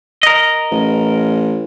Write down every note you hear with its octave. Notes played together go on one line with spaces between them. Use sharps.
A#4 D#5
A1